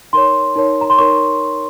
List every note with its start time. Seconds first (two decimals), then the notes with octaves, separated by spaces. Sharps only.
0.13 D#4 A#4 C#5 C6
0.56 D#4 A#4 C#5
0.81 A#5
0.90 C6
0.98 D#4 A#4 C#5 C#6